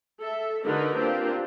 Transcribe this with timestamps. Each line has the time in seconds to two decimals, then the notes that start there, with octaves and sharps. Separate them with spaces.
0.21 A4 E5
0.64 D3 D#4 F#4 A#4 B4
0.97 A#3 C4 D4 F4 G4